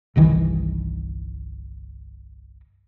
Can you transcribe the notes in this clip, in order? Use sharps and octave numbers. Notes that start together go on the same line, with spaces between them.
G1 C2 D#3 E3